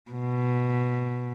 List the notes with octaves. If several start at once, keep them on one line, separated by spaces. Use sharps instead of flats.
B2